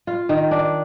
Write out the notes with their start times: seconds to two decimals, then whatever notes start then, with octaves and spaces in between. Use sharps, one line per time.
0.07 F4
0.29 D#3
0.51 D4